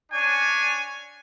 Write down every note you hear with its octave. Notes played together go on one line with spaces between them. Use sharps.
C#4 D4 C#5 G#5